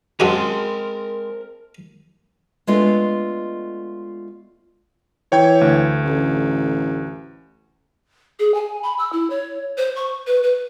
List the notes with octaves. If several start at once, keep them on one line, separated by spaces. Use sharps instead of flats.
F#2 G#3 C4 F#4 G#4 A#4 G#5 A5
G#3 A3 B3 D4 F4 A4
E3 C#5 G5 G#6
D2
A1
G#4
G#5
B5
E6
E4
C#5
C5
C#6
B4
B4